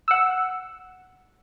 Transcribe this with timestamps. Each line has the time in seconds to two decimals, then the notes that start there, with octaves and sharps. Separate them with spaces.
0.08 F#5 E6